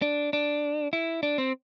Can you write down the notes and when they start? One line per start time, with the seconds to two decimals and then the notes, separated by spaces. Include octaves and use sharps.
0.02 D4
0.33 D4
0.93 E4
1.23 D4
1.38 C4